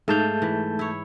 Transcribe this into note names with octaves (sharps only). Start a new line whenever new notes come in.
G#2 A3 F5 A5 G6
E3
E4 C#5